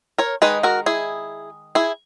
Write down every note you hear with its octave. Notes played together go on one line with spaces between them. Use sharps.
A#4 C#5
D#3 G#3 D#4 G#4 B4
F#4 A#4
E4 G#4
E4 G#4